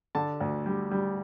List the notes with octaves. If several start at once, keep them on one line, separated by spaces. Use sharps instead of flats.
D3 A5
D2
G3
G3